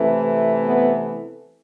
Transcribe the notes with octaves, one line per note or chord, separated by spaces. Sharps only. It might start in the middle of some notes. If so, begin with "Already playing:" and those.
Already playing: C3 E3 A3
B3